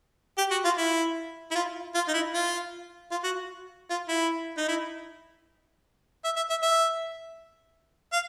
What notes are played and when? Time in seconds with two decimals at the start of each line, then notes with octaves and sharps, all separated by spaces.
0.38 G4
0.51 F#4
0.64 F4
0.78 E4
1.51 E4
1.55 F4
1.94 F4
2.08 D#4
2.13 E4
2.34 F4
3.11 F4
3.24 F#4
3.90 F4
4.08 E4
4.58 D#4
4.68 E4
6.24 E5
6.36 E5
6.50 E5
6.62 E5
8.13 F5